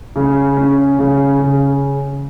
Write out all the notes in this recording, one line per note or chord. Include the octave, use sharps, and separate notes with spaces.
C#3
C#4
C#3
C#3